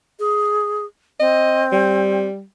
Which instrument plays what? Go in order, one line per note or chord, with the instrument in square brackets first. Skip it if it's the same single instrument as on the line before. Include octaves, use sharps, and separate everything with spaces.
[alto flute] G#4
[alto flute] C4 [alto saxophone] D#5
[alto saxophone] G3